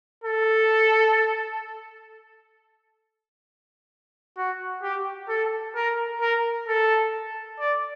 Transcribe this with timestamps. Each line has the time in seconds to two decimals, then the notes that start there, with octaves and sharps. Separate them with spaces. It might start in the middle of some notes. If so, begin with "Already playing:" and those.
0.24 A4
4.37 F#4
4.83 G4
5.29 A4
5.75 A#4
6.21 A#4
6.67 A4
7.59 D5